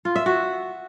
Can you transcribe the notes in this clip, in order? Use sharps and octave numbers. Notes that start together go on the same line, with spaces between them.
F4
E5
F#4